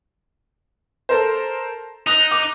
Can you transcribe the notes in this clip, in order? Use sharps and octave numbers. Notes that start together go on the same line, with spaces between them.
A4 A#4 C5
D#4 D#6 F#6 A#6
D6 F7